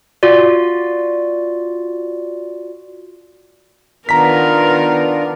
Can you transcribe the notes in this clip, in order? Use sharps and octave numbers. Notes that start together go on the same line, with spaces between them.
F4 F#4 D5
D#3 B3 D4 F4 A#4 A#5 B6